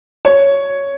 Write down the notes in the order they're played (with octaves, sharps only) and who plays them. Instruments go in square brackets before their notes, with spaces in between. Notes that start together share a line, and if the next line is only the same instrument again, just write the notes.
[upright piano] C#5